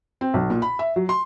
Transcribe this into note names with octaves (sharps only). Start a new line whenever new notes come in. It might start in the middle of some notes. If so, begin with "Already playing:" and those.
C4
B1
A#2
B5
E5
F#3
C6